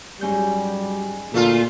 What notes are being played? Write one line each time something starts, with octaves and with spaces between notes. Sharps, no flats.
G#2 F#3 G3 C#4 G6
D2 A#2 A3 F4